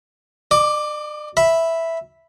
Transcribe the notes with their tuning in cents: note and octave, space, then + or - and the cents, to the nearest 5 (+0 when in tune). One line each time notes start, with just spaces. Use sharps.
D5 +45 D6 +0
E5 +0 B5 +0